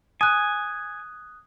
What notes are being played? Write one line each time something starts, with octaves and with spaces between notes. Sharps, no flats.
G#5 D#6 F#6